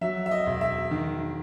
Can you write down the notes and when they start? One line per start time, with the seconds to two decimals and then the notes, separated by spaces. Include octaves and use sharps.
0.01 F#3 E5
0.26 E5
0.31 D#5
0.46 E1
0.61 E5
0.91 D#3